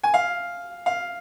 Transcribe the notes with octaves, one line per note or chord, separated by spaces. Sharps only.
G#5
F5
F5